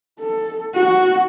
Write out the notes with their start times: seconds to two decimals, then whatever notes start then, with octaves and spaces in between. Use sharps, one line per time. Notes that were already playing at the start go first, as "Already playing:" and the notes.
0.20 A4
0.74 F#4